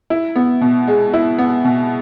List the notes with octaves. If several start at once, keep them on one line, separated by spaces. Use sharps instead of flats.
E4
B3
B2
G#3
E4
B3
B2